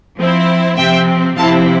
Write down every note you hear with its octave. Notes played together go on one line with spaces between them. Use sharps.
F3 C4 E4
C3 F3 C4 E5 G5
C3 F3 C4 E4 F5 A5